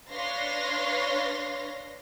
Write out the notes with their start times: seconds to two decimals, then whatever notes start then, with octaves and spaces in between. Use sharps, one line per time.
0.11 D4 B4 C#5 F5 C6 A#6